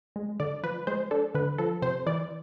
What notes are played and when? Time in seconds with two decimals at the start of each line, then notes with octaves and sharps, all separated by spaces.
0.16 G#3
0.40 D3 D5
0.63 F3 B4
0.87 G#3 C5
1.11 D4 A4
1.35 D3 B4
1.58 F3 A4
1.82 C3 C5
2.06 E3 D5